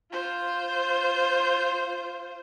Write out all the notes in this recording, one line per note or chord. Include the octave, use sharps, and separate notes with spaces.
F4 C5